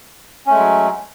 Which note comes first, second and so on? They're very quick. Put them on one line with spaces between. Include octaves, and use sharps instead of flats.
C#4 A3 G#3 F#3